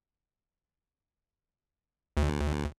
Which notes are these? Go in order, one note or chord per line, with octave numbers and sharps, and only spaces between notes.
D2